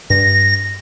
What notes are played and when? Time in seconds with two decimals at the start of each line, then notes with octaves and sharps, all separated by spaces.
0.10 G2 A#6